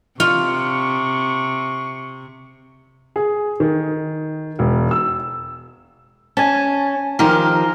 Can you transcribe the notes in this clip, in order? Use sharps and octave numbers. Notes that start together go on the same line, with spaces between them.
C3 F4 C#6
G#4
D#3
E1
E6
C#4 G#5 A5
D#3 F3 G4 A#4 F5